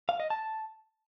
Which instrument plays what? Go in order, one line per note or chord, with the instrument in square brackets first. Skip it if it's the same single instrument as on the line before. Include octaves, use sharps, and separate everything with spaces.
[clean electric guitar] F5
D#5
A5